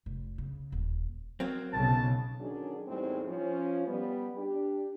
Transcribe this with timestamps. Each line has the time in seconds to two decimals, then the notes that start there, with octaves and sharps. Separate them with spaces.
0.06 F1
0.38 C#3
0.72 D#1
1.40 F#3 A#3 C4
1.73 B1 C#3 A5
2.40 D3 D#3 F#3 C#4 D4 G#4
2.88 E2 A2 G3 G#3 C4 D#4
3.27 F3 C#4
3.87 G3 B3
4.38 D4 G4